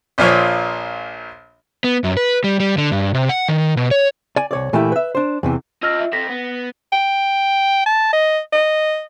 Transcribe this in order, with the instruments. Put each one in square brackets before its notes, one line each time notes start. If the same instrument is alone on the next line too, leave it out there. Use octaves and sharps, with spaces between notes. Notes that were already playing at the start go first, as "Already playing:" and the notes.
[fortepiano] A#1 A#2 F3 C#5
[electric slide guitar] B3
F#2
B4
G3
G3
D3
G2
C3
F#5
D#3
B2
C#5
[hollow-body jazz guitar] D5 G#5
C2 C#5 D5
A#2 E3 A3 A#3 E4 G4
B4 E5
D4 C5
E2 C3 E3
[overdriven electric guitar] F4 D#5 [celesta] E6 F6 A#6
[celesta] E5
[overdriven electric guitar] C4 A4 [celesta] A#6 B6
[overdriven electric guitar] B3
[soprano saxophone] G5
A5
D#5
D#5